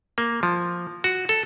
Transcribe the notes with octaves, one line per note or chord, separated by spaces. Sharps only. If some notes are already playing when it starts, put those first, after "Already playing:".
A#3
F3
F#4
A4